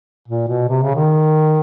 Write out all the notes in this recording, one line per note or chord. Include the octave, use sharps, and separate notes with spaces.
A#2
B2
C3
C#3
D#3